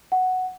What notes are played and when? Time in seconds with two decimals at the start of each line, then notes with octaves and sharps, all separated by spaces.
0.12 F#5